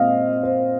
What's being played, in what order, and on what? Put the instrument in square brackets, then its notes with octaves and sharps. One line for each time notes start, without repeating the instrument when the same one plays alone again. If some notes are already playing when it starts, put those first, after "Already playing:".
Already playing: [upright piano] A#2 G#3 C4 D#5 F5
C5